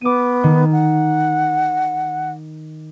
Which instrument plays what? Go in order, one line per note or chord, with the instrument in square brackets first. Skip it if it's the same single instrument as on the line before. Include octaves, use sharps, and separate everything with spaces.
[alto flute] B3 [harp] D6 D#7
[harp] D#3
[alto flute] F#5